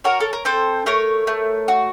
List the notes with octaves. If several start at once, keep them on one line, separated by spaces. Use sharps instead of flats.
F#4 A#4 C#5
A4
A#4
C4 A4 C5
A3 A#4 C#5
A3
F#4